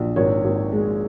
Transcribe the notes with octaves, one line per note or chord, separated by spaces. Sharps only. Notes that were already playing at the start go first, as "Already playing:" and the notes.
Already playing: A#1
G#1 C#5
G#1
G#3